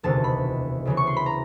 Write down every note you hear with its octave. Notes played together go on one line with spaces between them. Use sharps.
E1 D2 C3 D#3 A5
B5
D2 C#3 E3
C#6
C6
B5
A#5